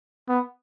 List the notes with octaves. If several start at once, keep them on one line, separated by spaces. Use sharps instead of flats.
B3